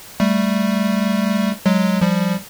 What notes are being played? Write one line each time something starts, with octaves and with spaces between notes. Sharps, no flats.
G3 A3
F#3 G#3
F3 G3